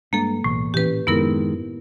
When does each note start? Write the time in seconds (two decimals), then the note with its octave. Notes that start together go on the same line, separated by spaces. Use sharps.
0.13 G2 G#3 A#3 D4 A4
0.44 B1 E2 A2
0.74 A#2 E3 C#4 G4 B4
1.07 F#1 F#2 D#3 G#3 B3 E4 A#4